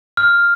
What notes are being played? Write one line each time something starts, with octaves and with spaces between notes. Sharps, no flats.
F6